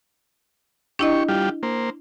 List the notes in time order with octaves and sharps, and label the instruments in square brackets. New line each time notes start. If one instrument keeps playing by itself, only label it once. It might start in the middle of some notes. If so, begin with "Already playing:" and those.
[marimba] D4 E4 D#5 [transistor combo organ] G4 C#6
[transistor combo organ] G3 F4 G4
A#3 C5